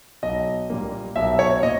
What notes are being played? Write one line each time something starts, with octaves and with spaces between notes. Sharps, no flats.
B1 D#5
A#2 G3 A#3
B1 E5
C#5
A#2 D#5